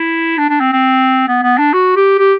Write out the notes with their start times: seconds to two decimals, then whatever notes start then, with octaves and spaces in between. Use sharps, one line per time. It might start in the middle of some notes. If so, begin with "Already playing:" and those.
Already playing: E4
0.38 D4
0.49 D4
0.60 C4
0.73 C4
1.28 B3
1.43 B3
1.58 D4
1.73 F#4
1.96 G4
2.18 G4